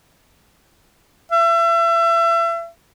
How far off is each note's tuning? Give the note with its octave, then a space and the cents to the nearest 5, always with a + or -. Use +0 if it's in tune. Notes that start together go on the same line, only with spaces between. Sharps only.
E5 +35